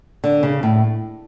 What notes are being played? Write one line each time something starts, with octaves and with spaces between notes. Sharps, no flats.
D3
C#3
A2